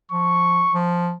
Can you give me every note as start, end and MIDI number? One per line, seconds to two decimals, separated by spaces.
0.11 0.65 53
0.11 0.77 85
0.74 1.13 53